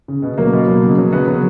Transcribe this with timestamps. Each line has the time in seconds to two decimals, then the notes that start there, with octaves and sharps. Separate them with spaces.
0.08 C#3
0.22 B2 B3
0.38 F#3 A#3
0.53 B2
0.67 F#3
0.83 C#3
0.98 F#3
1.13 C#3 B3
1.28 F#3